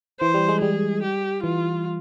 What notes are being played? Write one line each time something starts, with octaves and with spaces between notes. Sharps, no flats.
E3 C5
G3
G#3
G3 G#4
G4
E3 F4